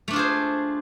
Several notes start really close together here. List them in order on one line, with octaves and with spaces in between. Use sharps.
A3 D4 F4 G#4 C5